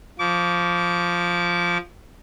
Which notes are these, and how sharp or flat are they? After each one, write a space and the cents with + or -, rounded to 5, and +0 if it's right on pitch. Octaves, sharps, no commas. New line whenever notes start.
F3 +0 D6 -35